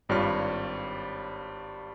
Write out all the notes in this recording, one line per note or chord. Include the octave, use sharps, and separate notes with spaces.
G#1 G2 G3 F4 C#5 F6